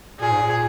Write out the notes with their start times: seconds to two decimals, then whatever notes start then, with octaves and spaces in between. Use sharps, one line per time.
0.20 A#2 G#4
0.31 G#2
0.42 A#2